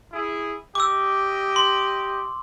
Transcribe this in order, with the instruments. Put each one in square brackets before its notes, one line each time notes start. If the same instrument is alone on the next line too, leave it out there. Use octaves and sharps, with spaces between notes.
[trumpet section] E4 G#4
[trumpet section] G4 D#5 [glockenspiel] D6 E6
[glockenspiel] C6